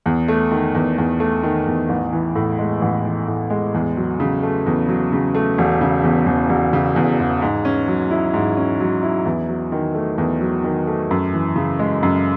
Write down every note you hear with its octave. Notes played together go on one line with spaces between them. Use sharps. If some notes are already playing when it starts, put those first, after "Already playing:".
E2
A3
D#3
E2
E2
A3
D#3
E2
A1
E3
A2
G#3
A1
E3
A2
G#3
E2
F#3
C#3
A3
E2
F#3
C#3
A3
E1
C#3
E2
E1
E1
C#3
E2
E1
G#2
C#4
F#3
E4
G#2
C#4
F#3
E4
E2
F#3
D#3
A3
E2
F#3
D#3
A3
F#2
E3
C#3
G#3
F#2